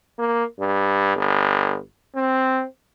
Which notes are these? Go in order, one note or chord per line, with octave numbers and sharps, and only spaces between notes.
A#3
G2
G1
C4